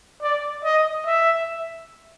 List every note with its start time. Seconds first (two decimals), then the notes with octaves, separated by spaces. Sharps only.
0.22 D5
0.64 D#5
1.06 E5